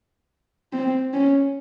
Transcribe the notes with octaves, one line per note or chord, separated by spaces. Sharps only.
C4
C#4